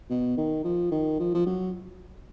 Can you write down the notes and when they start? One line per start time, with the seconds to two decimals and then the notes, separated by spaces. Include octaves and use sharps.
0.10 B2
0.37 D#3
0.64 F3
0.92 D#3
1.19 F3
1.34 F3
1.46 F#3